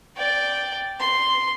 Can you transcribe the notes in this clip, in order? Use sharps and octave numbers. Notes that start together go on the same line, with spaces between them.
D5 G5
C6